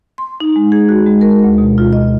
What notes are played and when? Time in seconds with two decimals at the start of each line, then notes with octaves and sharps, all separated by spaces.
0.18 C6
0.40 D#4
0.56 G#3
0.72 G#4
0.89 F#4
1.06 G#3
1.21 A#4
1.44 D2
1.58 B2
1.78 F4
1.93 D#5